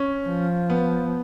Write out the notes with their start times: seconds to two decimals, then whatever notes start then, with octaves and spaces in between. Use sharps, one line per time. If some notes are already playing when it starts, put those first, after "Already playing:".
Already playing: C#4
0.27 F3
0.70 B3